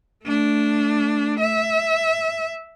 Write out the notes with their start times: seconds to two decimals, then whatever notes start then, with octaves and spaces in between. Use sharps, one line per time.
0.24 A3 D4
1.40 E5